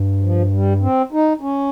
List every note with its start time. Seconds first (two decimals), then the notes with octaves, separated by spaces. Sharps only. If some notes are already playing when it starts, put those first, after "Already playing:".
Already playing: G2
0.21 F3
0.52 G3
0.81 C4
1.12 D#4
1.41 C#4